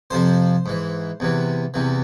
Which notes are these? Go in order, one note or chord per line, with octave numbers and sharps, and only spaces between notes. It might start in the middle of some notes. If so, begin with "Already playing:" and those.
F2 C3 F3 C5
G#2 E3
E2 C3 E3
E2 C3 E3